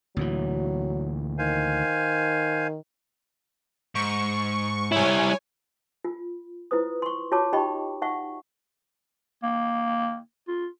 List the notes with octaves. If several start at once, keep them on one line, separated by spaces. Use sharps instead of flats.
D2 A#2 E3 F#3
D#3 C5 F5 G#5
G#2 C#6
G3 E4 C#5 G#5
F4
E4 F4 B4 C5 D#6
C6 C#6
F4 F#4 C#5 A5 D6
D#4 G4 D#5 G5 B5 C#6
D#4 E5 F#5 C#6
A#3
F4